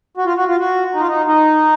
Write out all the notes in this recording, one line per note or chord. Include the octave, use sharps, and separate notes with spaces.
F#4
F4
F#4
F4
F#4
D#4
F4
D#4
D#4